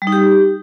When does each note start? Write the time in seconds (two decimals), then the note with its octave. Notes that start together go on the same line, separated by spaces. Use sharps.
0.02 G3
0.07 D#4
0.12 G4